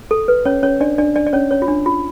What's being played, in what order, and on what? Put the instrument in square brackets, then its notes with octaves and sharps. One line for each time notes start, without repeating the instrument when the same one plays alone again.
[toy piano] A4
B4
C#4 C#5
C#4 C#5
D4 D5
D4 D5
D4 D5
D5
C#4 C#5
C#4 C#5
F4
D4
F4